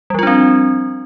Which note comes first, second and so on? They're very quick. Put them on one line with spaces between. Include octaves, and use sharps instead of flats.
G3 F3 F4 D4 C4